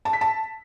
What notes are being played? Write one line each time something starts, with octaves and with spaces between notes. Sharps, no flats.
A5
B6
A5